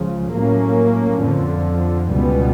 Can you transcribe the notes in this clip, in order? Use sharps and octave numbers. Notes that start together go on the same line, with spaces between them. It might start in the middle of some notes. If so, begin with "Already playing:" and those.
Already playing: C#2 C#3 F3
A2 F#3 A#3 C#4
F2 D3 F3
C#2 B2 G3 B3